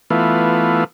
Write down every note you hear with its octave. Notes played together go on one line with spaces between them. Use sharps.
E3 A3 B3 F4